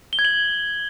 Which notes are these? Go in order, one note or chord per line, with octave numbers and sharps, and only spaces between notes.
G7
G#6
F#7